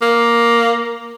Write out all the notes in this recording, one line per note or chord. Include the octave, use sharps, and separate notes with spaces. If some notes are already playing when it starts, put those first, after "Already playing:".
A#3